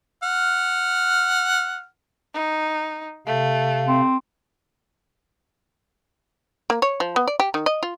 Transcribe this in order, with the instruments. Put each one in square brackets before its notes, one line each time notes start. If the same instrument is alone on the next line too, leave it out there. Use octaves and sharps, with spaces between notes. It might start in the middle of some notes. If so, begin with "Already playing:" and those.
[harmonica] F#5 F6
[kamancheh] D#4
[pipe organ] C3 F5 [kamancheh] A3
[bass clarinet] C4
[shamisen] A#3
C#5
F3
B3
D5
G4
D#3
D#5
F4